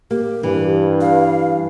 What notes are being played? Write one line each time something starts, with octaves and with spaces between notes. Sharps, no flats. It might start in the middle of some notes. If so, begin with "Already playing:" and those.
A#3 G4
G2 E3
F5